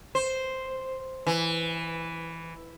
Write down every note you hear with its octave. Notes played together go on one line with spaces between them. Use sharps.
C5
E3